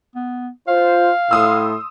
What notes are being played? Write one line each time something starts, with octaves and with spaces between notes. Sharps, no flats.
B3
F4 C5 F5
A2 C6 D#6 E6